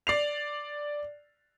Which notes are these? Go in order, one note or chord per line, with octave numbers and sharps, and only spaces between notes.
D5 C7 F7